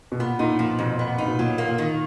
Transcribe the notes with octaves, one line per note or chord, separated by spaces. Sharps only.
B2
A#2 B3
A#2 D#4
A#2 F3
F2 B2
B3
D#4
B2
A#2 F#3
A#3
A#2
D#3